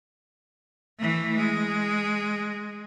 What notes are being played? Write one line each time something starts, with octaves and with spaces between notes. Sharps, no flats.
E3 A3
G#3